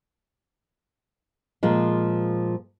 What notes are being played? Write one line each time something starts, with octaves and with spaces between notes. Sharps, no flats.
A#2 F3 G#3